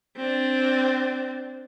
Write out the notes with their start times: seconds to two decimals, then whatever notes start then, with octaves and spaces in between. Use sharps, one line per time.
0.17 C4 D4